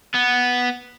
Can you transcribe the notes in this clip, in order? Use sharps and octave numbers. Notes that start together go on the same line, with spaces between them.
B3